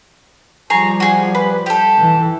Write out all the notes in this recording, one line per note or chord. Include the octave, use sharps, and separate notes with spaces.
F3 G3 G#4 C#5 A#5
F#4 G#4
B4
G4 A4
E3